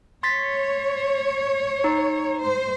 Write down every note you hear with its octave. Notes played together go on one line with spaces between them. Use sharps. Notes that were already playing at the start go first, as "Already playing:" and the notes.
C#5 C6 A6 B6
D#4
C5